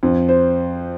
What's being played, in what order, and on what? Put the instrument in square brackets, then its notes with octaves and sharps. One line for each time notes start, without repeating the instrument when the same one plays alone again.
[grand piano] F2
C5